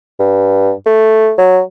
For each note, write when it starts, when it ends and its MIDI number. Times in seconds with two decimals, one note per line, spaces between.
0.19 0.72 43
0.86 1.33 57
1.38 1.60 54